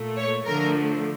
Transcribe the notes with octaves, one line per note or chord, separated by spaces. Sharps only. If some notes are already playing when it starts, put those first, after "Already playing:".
Already playing: A#2 A3
C#5
D3 F3 A3 A#4